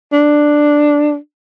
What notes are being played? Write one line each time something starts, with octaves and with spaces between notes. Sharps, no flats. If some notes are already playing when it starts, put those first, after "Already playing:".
D4